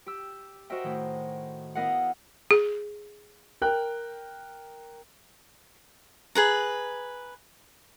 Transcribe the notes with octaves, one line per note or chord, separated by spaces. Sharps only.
G4 E6
F#4 A#4 C5 D#5 E5 G5
A2 D#3
B3 E4 A#4 D#5 F5 F#5
G#4
A#4 G5 F#6
G#4 B4 A#5